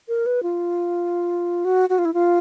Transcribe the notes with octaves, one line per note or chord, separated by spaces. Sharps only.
A#4
B4
F4
F#4
F#4
F4
E4
F4